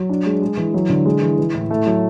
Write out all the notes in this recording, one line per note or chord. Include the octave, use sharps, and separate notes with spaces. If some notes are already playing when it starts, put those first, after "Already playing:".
Already playing: F#3
D4
G#3
G#3
E3
F#3
D3
G#3
E3
E3
A2
A3
F#3